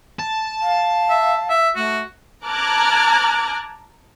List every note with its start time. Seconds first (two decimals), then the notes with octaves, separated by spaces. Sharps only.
0.20 A5
0.62 F5
1.10 E5
1.50 E5
1.76 A3 F#4
2.45 A5 A#5 D6 F6 F#6 G#6